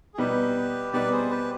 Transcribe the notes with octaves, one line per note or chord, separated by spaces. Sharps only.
G#4
B2 G3 B3 D#4 G4 B4
B2 G3 B3 D#4 B4 D5
G#4 C5
G4 B4